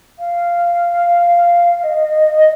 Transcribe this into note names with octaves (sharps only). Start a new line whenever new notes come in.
F5
D#5